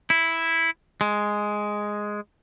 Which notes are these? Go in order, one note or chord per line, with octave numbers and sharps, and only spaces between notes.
E4
G#3